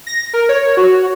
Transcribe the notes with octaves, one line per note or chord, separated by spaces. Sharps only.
A#6
A#4
C#5
F#4